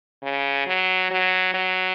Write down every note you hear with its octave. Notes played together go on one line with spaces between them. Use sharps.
C#3
F#3
F#3
F#3